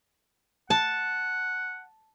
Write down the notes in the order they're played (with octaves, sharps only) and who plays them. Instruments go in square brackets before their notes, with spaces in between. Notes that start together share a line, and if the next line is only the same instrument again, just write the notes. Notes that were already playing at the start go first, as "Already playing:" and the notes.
[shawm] F#5 [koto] A5